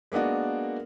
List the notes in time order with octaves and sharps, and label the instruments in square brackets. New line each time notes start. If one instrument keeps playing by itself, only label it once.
[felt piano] G#3 A#3 B3 D4 F#4